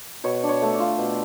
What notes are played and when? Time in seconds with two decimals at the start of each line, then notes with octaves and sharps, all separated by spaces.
0.24 B2 C#5
0.43 D4
0.48 C#5
0.62 A3
0.73 D5
0.79 F4
0.98 B2